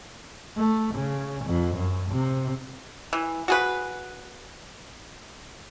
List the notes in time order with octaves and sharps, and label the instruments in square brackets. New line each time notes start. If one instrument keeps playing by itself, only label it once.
[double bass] A3
C#3
F2
F#2
C3
[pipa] E3
F#4 G#4 B4